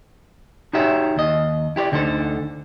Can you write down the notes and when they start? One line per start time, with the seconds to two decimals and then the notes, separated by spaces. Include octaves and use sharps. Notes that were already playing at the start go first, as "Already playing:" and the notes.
0.73 D#4 F#4 G4 C#5 E5
1.16 D#2 D#5
1.76 E4 G4 B4 D5
1.92 D2 D3 D#4 A4 C5